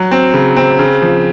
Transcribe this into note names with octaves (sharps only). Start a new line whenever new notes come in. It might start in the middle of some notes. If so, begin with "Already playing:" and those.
Already playing: F#3
C4
C#3
C4
C#3
F3